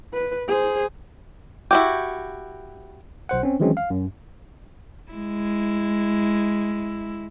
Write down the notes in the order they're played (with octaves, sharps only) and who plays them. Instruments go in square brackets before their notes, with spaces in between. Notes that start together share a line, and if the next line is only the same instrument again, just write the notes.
[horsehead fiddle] B4
G#4 C5
[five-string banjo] E4 F#4 G4
[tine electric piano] B1 C5 F#5
C4 C#4
D#3 E3 F#3 G#3 C4 C#4
F5
F#2
[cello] G#3 E4